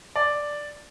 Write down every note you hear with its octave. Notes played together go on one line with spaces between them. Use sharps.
D5